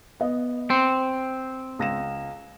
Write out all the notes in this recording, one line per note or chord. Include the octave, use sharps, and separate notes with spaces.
B3 D#5
C4 C#7
C#2 A#6 E7